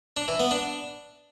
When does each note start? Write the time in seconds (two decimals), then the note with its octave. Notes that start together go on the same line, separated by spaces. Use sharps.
0.17 D4
0.28 E3
0.39 B3
0.51 D4